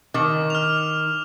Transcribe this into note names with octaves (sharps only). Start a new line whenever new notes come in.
D#3 D6
F6 F7